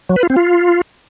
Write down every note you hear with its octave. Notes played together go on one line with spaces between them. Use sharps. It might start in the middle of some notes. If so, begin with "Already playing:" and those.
F#3
B4
F4
C4
F4